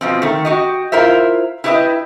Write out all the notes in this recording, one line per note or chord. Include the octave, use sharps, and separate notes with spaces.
B2 F3 C4
D#3 A3
F#4 G4 D#5
E4 F4 A#4 C5 E5
E4 G4 B4 C#5 D#5 E5